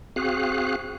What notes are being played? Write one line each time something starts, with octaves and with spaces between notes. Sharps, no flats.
C4 F#4 G#4 F5 F#6